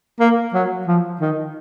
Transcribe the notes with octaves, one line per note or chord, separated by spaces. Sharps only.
A#3
F#3
F3
D#3